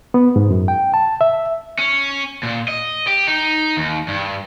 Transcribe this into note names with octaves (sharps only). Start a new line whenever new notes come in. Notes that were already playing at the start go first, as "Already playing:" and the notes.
B3
G#2
F#2
G5
A5
E5
C#4
A#2
D#5
G4
D#4
D#2
G2